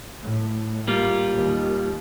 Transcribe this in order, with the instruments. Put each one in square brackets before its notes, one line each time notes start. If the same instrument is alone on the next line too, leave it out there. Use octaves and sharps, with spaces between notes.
[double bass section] A2
[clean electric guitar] G3 A#3 F4
[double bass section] D#2